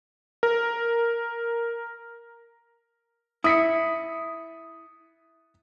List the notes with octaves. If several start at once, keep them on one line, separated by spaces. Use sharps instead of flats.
A#4
E4 D#6 B6 C#7